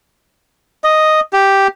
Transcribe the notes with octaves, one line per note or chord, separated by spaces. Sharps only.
D#5
G4